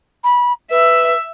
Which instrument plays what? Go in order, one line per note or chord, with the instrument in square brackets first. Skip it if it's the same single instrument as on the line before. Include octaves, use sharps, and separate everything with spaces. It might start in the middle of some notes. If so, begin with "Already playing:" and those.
[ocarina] B5
[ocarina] B4 [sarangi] E5